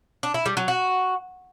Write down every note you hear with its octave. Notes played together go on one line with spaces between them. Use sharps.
D4
E4
G3
F#3
F#4